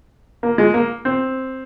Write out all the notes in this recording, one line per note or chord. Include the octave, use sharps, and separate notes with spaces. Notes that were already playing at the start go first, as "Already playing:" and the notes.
A#3
G#3
A#3
C4